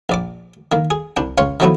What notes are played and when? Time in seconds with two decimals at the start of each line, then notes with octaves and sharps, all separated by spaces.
0.09 A#1 D5 D6
0.72 D#3 A#3
0.90 G#4
1.16 C2 D4 G5
1.38 C#2 C#5 F5 C6
1.60 D#3 F3 F#3 A3 B3 E4